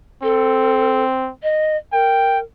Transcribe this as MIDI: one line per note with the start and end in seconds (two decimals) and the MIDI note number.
0.23 1.30 60
0.23 1.03 69
1.43 1.77 75
1.93 2.42 70
1.93 2.39 79